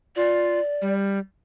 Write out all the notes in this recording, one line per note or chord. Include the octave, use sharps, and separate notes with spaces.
F4 D5
G3